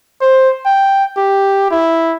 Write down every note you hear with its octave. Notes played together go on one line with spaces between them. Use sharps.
C5
G5
G4
E4